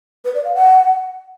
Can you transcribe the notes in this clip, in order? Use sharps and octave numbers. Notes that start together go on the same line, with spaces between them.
B4
D5
F5
F#5